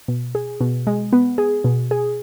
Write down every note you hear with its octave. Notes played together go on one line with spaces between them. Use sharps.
B2
G#4
B2
G#3
B3
G#4
B2
G#4